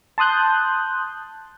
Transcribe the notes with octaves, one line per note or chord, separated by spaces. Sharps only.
A5 C6 D#6 F#6 G6